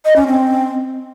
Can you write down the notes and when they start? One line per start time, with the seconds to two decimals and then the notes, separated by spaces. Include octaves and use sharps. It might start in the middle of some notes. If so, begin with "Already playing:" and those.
0.05 D#5
0.16 C#4
0.27 C4